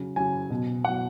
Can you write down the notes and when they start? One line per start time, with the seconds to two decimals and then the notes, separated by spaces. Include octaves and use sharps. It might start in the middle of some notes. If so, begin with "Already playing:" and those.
Already playing: C#3 F#3
0.16 C#3 F#3 G#5
0.50 B2 F#3
0.85 B2 F#5
0.87 F#3